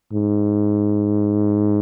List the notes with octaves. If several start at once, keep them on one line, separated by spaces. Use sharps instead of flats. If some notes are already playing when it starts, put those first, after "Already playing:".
G#2